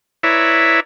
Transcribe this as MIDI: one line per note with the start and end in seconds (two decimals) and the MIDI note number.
0.23 0.80 64
0.23 0.80 71
0.23 0.80 73
0.23 0.80 74
0.23 0.80 76
0.23 0.80 82